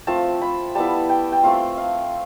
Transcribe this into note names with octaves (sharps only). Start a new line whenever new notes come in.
F3 A3 C4 F4 A5
B5
G3 B3 E4 A5
G5
G5
A3 C4 F4 F5
F5